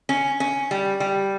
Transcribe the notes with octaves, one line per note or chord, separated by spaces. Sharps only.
C#4
C#4
G3
G3